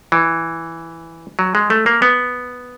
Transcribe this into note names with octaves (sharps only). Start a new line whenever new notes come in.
E3
F#3
G#3
A3
A#3
B3